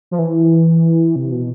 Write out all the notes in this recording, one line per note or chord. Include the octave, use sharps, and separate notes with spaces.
F3
E3
C3
B2